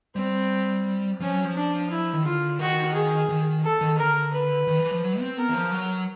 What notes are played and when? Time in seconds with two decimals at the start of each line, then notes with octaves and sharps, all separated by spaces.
0.15 G3 C4
1.20 F3 C#4
1.32 F#3
1.44 F3
1.55 D4
1.90 E4
2.13 D#3
2.24 D3 F4
2.59 D#3 F#4
2.94 G#4
3.29 D#3
3.64 A4
3.81 D#3
3.98 D3 A#4
4.33 B4
4.67 D#3
4.79 E3
4.92 F3
5.03 F#3
5.20 C4
5.38 B3 A#4
5.49 E3
5.55 F3
5.72 F#3